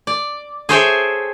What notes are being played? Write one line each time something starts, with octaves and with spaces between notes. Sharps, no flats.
D5
G#4 A4 C5 C#5 E5 G5